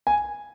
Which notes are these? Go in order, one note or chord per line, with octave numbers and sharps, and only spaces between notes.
G#5